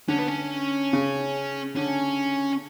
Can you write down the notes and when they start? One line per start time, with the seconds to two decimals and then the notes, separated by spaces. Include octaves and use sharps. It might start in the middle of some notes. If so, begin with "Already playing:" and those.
0.08 D3 C#4
0.19 B3
0.28 C#4
0.93 C#3
1.76 D3 C#4